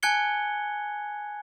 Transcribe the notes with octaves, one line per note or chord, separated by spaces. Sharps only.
G#5 A5 F#6 G#6 C#7 G7